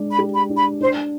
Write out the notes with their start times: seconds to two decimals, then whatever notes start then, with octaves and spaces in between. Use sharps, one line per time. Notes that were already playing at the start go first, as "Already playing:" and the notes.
Already playing: G#3 D4 D5
0.11 B5
0.18 G4
0.34 B5
0.49 D4
0.57 B5
0.81 D4 C5